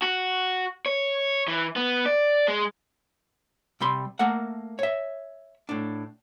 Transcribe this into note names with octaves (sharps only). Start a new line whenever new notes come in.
F#4
C#5
E3
B3
D5
G#3
C3 G3 B5 C6
A3 A#3 A#4 F#5
C#5 E5
A2 D4